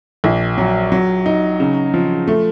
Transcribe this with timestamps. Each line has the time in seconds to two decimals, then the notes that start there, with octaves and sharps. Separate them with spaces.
0.24 A#1
0.58 F#3
0.92 F#3
1.26 D#4
1.60 C#3
1.94 F3
2.28 A3